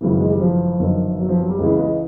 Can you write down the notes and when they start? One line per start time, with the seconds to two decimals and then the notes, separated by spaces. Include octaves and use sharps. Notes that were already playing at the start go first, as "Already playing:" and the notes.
0.01 G#1 F#2 C#3 E3
0.20 G#3
0.30 G3
0.40 F3
0.79 G1 F#2 D#3
1.20 F#3
1.29 F3
1.39 F#3
1.49 G3
1.58 C#2 C#3 E3 G#3
1.78 G#3